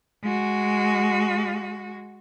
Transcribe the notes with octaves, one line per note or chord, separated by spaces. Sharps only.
G#3 F#4